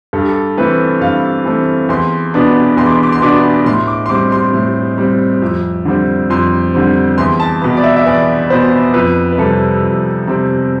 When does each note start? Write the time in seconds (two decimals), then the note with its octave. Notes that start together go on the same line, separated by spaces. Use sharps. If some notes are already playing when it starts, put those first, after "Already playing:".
0.13 G2 A4
0.21 G4
0.29 A4
0.57 E3 A3 C4 B4
1.01 G2 F5
1.45 E3 A3 C4
1.89 E2 C6
2.34 B2 B3 D4
2.77 E2 C6
2.86 D6
2.94 C6
3.03 D6
3.12 C6
3.22 B2 B3 D4 D6
3.66 A2 C6
3.87 D6
4.06 C6
4.09 G3 C4 D6
4.32 C6
4.53 A2
4.98 G3 C4
5.42 F2
5.85 D3 G3 C4
6.30 F2 C6
6.74 D3 G3 C4
7.18 E2 C6
7.40 A5
7.62 B2 B3
7.77 D5
7.84 E5
7.96 E5
8.06 E2 D5
8.50 B2 B3 C5
8.94 F2 B4
9.32 B4
9.38 C3 G3 C4 A4
9.83 F2
10.27 C3 G3 C4